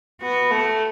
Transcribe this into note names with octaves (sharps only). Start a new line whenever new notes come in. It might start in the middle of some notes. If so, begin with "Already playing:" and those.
B3 F#4
A3